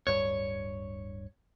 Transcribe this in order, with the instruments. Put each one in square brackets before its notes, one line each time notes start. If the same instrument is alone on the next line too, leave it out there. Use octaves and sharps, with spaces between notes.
[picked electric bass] D1 G2 [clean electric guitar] C#5